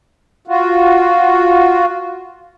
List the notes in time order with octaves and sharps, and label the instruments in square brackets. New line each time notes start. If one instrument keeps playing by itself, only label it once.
[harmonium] F4 F#4